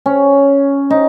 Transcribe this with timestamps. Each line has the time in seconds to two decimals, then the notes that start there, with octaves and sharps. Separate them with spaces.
0.06 C#4
0.90 D#4